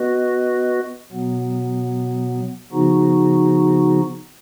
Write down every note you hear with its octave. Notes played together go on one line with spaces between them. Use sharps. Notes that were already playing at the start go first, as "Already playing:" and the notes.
Already playing: B3 F#4 B4 D#5
B2 F#3 B3
C#3 F3 B3 D#4 F#4